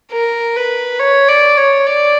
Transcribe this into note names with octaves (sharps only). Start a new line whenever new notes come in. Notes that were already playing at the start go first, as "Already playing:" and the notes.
A#4
B4
C#5
D5
C#5
D5